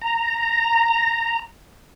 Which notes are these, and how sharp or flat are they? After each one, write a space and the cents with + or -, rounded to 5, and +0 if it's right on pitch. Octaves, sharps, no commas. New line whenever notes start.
A#5 -10